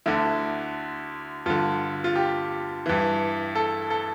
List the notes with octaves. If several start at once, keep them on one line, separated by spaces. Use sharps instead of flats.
D2 D3 E4
G2 D3 F4
F4
G4
G2 E3
A4
A4